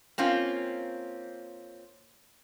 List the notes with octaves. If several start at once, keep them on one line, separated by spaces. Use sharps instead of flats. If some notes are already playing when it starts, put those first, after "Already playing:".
A#3 C4 C#4 F4